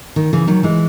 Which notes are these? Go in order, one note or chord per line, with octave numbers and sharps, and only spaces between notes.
D#3
C#3 E3
D#3 F#3
E3 G#3